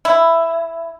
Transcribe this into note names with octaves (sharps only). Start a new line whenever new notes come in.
E4